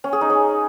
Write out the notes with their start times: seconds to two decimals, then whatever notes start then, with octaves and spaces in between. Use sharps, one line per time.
0.04 C#4
0.13 G#4
0.21 D#4
0.30 C#4